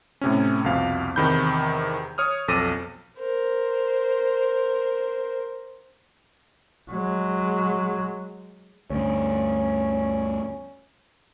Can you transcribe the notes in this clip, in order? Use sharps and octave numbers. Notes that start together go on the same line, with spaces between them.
A2 C3 C#4
C2 F2 B2 F5
E2 C3 D#3 B5 G6
C#5 D#6 F6
B1 F2 A4 D6 A#6 D#7
A#4 C5
F#3 G#3
D2 G2 C#4